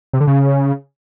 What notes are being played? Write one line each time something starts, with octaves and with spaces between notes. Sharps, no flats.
C3
D3
C#3